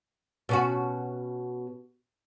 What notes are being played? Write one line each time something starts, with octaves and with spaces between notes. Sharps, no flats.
B2 C#4 F#4